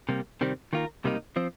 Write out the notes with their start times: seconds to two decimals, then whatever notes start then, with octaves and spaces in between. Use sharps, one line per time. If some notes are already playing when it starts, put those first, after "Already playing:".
0.09 C3 G3 A#3
0.41 C3 D#3 G3 C4
0.73 D#3 A#3 F4 A#4
1.04 C#2 C3 G3 A#3 D#4
1.36 F3 C4